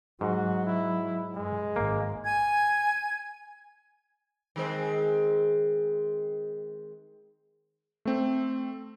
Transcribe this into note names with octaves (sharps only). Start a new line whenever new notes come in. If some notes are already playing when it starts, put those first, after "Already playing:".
G#2 F#3 F#4
E4
G2 G#3
G#1 A#3
G#5 G#6
D#3 G#3 C4
A3 C4